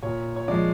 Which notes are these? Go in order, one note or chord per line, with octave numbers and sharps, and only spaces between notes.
A#2 C#5
C#5
F3 G#3 D5